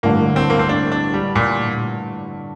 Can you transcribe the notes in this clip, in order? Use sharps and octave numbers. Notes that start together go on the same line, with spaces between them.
A1 G2 D3 A#3
C4
A#3
C4
D4
D4
G3
A#2